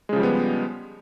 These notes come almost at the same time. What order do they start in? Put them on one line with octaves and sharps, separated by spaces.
G#3 C#3 F3 G3 B3